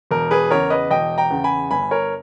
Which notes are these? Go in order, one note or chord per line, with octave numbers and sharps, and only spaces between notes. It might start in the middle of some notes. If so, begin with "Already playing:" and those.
E1 A#4
G#4 B4
E2 C#3 A#4 C#5
B4 D#5
E1 D#5 G5
G5 A#5
E2 C#3
G#5 B5
G1 G#5 B5
A#4 C#5